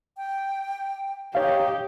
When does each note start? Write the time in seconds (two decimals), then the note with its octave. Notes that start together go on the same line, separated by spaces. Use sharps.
0.17 G5
1.35 D#4 G4 C#5 F5